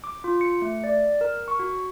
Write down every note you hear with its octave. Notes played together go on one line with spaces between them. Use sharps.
D6
F4
C#7
A3
D5
A#4
C#6
F#4